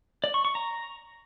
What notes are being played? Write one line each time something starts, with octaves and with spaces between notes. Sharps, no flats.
D5
C#6
C#6
A#5